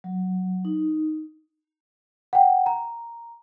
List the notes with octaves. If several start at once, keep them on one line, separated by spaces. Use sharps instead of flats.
F#3
D#4
F#5 G5
A#5